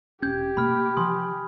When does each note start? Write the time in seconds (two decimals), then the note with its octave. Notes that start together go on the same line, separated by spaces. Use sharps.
0.22 E1 C#4 G4 G6 G#6
0.57 B2 A3 A#3 B5 F6
0.97 C3 E3 F3 G#5 C6 D#6